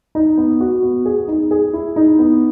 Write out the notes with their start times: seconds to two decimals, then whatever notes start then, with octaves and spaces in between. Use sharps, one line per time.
0.15 D#4
0.37 B3
0.60 F#4
0.83 B3
1.05 G#4
1.28 D#4
1.51 G#4
1.73 E4
1.96 D#4
2.19 B3